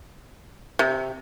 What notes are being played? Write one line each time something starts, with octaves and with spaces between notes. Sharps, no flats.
C3